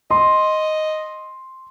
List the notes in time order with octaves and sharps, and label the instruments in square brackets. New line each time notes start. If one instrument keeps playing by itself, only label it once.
[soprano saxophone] D#5 [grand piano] C6